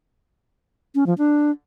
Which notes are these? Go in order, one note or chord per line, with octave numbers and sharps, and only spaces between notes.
C#4
F3
D4